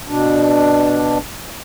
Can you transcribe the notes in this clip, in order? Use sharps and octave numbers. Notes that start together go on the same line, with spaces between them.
B2 D4